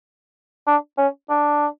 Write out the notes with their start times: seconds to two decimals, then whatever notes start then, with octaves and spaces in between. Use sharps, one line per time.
0.67 D4
0.98 C#4
1.29 D4